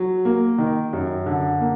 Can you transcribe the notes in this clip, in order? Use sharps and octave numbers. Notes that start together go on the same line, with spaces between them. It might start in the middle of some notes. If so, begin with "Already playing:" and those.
Already playing: F#3
A#3
D#3
F#2
D3
A#3